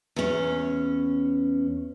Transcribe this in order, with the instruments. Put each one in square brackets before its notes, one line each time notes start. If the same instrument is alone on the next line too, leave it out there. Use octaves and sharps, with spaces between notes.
[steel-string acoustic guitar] E2 C#4